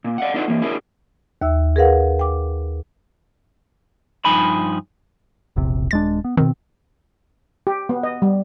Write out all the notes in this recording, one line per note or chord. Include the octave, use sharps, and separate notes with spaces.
A#2
D5 F5 F#5
D4 D#4 F4 A4 B4 F#5
E3 A#3
D4 E4 G#4 A#4
D#2 E5 E6
G#4 A#4 B4 F5 F#5
G5 D6
G2 F3 D#4 G#5 B5
E1 A#1 C3
D#1 G#3 D4 A6
B3
B2 D#3 C4
G4
B3
D#5
G3